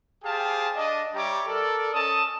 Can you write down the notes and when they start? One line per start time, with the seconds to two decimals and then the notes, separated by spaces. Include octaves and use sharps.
0.24 G4 G#4 C5 F5 G5 A5
0.75 D4 D#5
1.14 G3 G4 C#5 E5 A#5 D6
1.47 A4 A#4 D5
1.93 C#4 A4 D#5 A5 D#6